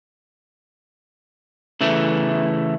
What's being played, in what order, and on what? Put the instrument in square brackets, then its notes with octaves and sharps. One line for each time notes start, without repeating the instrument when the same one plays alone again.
[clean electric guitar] C#3 E3 A3